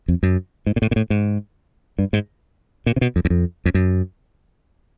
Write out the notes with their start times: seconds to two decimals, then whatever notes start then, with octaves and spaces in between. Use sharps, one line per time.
0.08 F2
0.23 F#2
0.66 G#2
0.76 A#2
0.82 A2
0.91 A#2
0.96 A2
1.10 G#2
1.99 G2
2.13 G#2
2.86 A#2
2.96 C3
3.01 B2
3.16 F2
3.25 E2
3.30 F2
3.66 F2
3.74 F#2